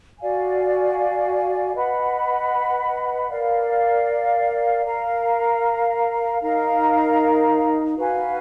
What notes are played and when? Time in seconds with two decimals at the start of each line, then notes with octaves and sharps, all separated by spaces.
0.19 F#4 D5 F5 G#5
1.75 B4 D#5 F#5 B5
3.29 A#4 D5 F5
4.85 A#4 F5 A#5
6.42 D#4 A#4 F5 A#5
7.97 F#4 B4 F5 G#5